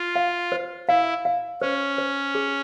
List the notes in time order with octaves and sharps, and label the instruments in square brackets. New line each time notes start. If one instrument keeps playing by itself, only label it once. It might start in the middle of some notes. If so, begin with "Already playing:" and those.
Already playing: [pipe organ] F4
[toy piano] F5
C5
[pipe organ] E4 [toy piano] F5
[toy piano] F5
[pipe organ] C#4 [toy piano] C5
[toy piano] C5
G#4